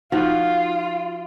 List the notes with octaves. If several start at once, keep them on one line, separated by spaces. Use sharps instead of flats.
F3 D#4 F4 F#4